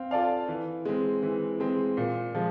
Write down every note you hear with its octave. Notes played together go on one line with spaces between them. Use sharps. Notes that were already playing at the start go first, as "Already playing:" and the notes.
Already playing: C4 F5
F4 A4 D5 F5
E3
G#3 C4
E3
G#3 C4
A#2
F3 G#3